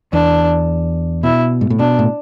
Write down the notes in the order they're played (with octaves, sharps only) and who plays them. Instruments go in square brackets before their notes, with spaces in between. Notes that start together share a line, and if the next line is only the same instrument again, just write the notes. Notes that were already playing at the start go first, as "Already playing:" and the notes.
[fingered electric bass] E2 [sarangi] D4
[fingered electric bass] B2 [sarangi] E4
[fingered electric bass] G#2
A2
[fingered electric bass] B2 [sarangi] D4
[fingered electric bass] A2